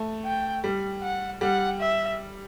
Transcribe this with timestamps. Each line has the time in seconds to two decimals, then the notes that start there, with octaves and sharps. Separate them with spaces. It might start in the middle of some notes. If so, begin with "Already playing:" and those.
Already playing: A3
0.25 G5
0.64 G3
1.03 F#5
1.41 G3 F#5
1.80 E5